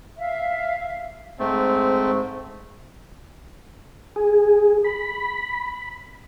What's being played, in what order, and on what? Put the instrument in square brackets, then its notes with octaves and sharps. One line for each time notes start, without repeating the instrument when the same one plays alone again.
[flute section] E5 F5
[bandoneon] G#2 A3 C4
[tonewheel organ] G#4
B5